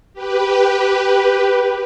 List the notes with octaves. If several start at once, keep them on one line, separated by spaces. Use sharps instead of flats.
G4 B4